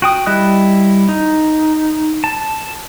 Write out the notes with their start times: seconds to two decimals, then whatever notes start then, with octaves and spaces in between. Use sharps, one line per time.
0.02 F#4 G5 D#6
0.27 G3 E4 D#5 F#6
1.09 D#4
2.24 A5